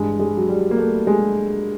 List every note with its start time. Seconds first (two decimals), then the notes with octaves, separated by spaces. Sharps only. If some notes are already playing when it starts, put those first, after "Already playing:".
Already playing: G2 E3 G#3
0.20 G#3
0.37 F#3
0.49 G3
0.71 A#3
0.78 A3
1.07 G#3